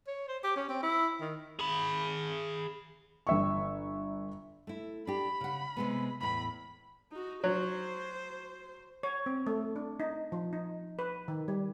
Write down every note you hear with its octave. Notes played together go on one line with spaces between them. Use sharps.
C#5
C5
G4
C#4
C4
E4
D#3
G#4 B5
G1 E5 C#6
A3 E4
D4 G4 B5
C#3 F#5
C3 G#3 B3
E2 A2 B5
D#4 F#4
F#3 C5
C#5
C4
A3
D4
D#4
F3
D#4
B4
D#3
G3